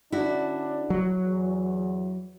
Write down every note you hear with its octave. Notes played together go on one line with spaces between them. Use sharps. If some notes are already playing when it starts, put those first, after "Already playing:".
D3 C#4 D4 E4 F#4
F#3
E2